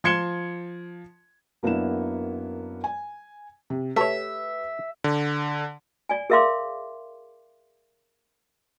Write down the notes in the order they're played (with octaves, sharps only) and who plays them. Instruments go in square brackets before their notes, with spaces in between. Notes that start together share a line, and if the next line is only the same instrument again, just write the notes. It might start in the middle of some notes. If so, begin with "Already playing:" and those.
[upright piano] F3 C6 G#6 C#7 E7 G7
[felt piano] F#2 A#3 B3 D4 E4 E7
G#5
C3
[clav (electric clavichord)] A3 C#5 [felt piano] G4 B4 [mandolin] E5
[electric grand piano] D3
[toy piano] D5 G#5
G#4 A#4 E5 F5 C6 D6